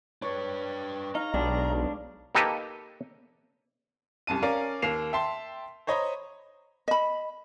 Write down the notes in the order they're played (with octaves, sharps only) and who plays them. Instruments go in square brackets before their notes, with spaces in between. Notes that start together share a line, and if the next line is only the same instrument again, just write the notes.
[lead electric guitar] D4 B4 [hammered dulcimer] C#5
[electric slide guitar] D#4 [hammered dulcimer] F5 [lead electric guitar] A#5
[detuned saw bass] B1 [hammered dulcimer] G3 [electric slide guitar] G#3 D4
[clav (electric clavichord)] A#3 D#4 G4 A4 B4 D#5
[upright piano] C2 F#2 A5 D#7
C#4 A#4 D5 F5
D#2 A#3 C7 E7 F7
E5 G5 A5 C6
C5 C#5 D#5 A#5 B5
[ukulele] D#5 B5